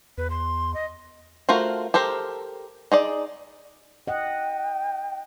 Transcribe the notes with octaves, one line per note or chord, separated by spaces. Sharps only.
E2 B4
C6
D#5
A3 F4 F#4 A#4 C5
G4 A4 A#4 C5
D#4 G#4 D5
D#5 F#5 G5